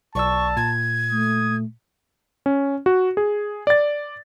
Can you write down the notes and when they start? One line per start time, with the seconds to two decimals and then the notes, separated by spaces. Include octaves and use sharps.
0.15 B1 D5 A5 C#6 E6
0.57 A#2 G#6
1.11 A3 D#6
2.46 C#4
2.86 F#4
3.17 G#4
3.67 D5 A6